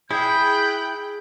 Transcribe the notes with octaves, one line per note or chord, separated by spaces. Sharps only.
E4 G#4 G5 F#6 G6